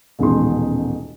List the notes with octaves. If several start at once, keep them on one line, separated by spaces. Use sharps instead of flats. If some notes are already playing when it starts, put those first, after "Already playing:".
D#1 A1 B2 G#3 D#4 C6